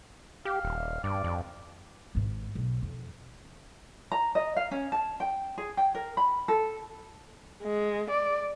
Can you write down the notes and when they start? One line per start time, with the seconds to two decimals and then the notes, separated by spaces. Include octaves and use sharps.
0.45 G4 F5
0.63 D#1
1.04 G2 D5
1.24 F2
2.15 G#1 G#2
2.55 B1
2.82 F2
4.12 A#5
4.35 D#5
4.56 F5
4.71 C#4
4.92 A5
5.20 G5
5.58 G#4
5.77 G5
5.95 A#4
6.17 B5
6.48 A4
7.63 G#3
8.11 D5